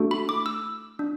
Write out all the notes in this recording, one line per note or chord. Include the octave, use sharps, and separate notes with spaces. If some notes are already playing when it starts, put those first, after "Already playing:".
Already playing: A3 D4 F#4 A4
B5
D6
E6
D4